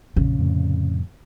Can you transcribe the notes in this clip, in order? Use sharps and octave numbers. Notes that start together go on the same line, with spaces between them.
A#1 F2 C#3
F2 A2 C3